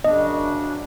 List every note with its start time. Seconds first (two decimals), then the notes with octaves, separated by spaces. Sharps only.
0.04 F#2 C#3 D4 D#5